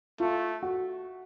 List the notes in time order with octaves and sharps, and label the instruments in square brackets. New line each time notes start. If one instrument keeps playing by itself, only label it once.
[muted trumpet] A3 [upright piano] F4
[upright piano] F#4